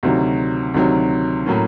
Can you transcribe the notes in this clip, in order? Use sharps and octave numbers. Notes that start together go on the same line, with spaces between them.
D2 C3 D#3 F#3
D2 C3 D#3 F#3
A2 F#3 A#3 C#4